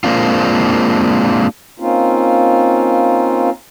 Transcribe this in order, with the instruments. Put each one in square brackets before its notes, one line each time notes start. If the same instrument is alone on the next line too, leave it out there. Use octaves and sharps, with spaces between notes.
[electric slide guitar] G#3 A#3 C4 D4 F4
[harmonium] A#3 C4 C#4 D#4 F4